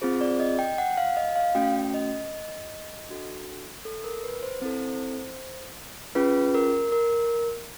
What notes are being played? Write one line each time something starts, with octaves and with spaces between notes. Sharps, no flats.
C4 F4 G#4 C5
D5
D#5
G5
F#5
F5
D#5
F5
A3 C#4 F#4 G5
D#5
D4 F#4 A4
A4
A#4
B4
C5
C4 E4 A4
C#4 F4 G#4 B4
A#4
A#4